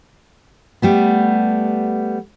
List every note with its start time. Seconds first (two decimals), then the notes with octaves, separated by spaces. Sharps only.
0.82 G3 A3 B3